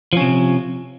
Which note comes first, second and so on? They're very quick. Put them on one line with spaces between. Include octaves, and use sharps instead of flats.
F3 C#4 C3